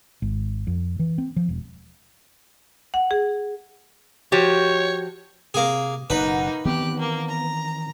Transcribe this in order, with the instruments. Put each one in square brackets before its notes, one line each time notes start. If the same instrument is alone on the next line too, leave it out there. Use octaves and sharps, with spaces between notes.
[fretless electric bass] G#1
F2
E3
C4
F3
E1
[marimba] F#5
G#4
[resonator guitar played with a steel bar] F3 F#4 G4 [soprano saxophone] C#5
[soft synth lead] C3 [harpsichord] A#3 G#4
[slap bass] F#1 B2 [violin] A#3 D#4 [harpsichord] B4 [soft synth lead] F#5
[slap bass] D#3 E3 C4 [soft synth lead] B3 [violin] G4 F#6
[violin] A#3
A#5